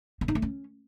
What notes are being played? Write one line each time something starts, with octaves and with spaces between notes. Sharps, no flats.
C4
D#4
A3
C#4